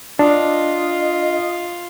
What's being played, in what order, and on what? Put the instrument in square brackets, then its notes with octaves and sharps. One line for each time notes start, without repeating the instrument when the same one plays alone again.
[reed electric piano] D4 [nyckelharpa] F4 [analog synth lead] D#5